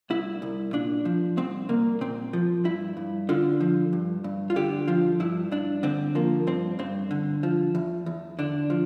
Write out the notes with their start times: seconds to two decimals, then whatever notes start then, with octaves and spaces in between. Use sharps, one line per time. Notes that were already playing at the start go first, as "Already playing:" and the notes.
0.10 C2 E4
0.42 C2
0.73 A#2 D4
1.05 F3
1.37 C2 C4
1.69 C2 A#3
2.01 A#2 C4
2.33 F3
2.64 G2 E4
2.97 G2
3.29 D3 F4
3.61 F3
3.93 G2
4.24 G2
4.50 F4
4.56 D3 G4
4.88 F3 F4
5.20 G2 E4
5.51 G2 D4
5.83 D3 C4
6.15 F3 A#3
6.47 G2 C4
6.79 G2 C4
7.11 D3
7.43 F3
7.75 E2
8.06 E2
8.39 D3 D4
8.70 F3